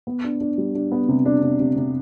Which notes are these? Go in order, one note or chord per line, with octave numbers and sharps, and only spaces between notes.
B3
D4
D4
G3
D4
B3
C3
D4
C3
C3
C3